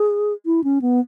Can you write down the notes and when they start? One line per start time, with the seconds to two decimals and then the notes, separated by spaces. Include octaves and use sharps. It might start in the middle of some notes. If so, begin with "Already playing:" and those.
Already playing: G#4
0.46 E4
0.64 C#4
0.81 B3